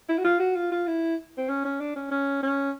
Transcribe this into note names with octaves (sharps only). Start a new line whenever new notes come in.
E4
F#4
F4
F#4
F4
F4
E4
C4
C#4
C#4
D4
C#4
C#4
C#4